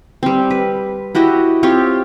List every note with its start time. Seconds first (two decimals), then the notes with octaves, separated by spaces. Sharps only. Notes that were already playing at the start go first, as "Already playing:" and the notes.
0.23 G3 C4
0.51 B4
1.15 E4 F#4 G4 D#5
1.63 C4 F4 G4 C#5